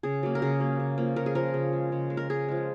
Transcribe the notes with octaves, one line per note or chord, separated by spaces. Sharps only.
C#3 G#4
F#3 A#3
A#4
C#3 G#4
F#3 A#3
C#3
F3 A#3
C#3 A#4
G#4
F3 A#3 A#4
C#3
G#3
C#3
G#3
A#4
C#3 G#4
F3 G#3